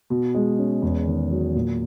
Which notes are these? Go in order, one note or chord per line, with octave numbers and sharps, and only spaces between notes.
B2
G#3
C#4
E2
D#3
F#3
A#2